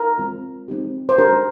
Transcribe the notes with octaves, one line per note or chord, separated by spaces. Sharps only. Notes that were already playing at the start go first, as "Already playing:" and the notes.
Already playing: A#4
G#3 C4 F4
G#3 C4 D#4 G4
C5
G#3 D4 G4 A#4